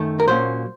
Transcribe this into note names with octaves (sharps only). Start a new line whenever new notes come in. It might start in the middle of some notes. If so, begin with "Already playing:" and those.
Already playing: F#2 D#3 A3
A#4
A#2 F#3 A#3 C#4 C5